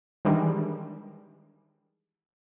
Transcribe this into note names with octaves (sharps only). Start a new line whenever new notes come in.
D#3 E3 G3 G#3 D4